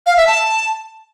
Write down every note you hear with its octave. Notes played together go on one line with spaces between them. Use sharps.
F5
E5
A5